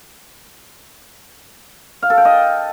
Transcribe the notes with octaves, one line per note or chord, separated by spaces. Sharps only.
F5
A4
G5
D#5